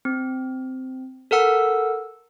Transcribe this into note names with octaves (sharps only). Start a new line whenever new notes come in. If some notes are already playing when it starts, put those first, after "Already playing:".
C4
A4 A#4 F#5 E6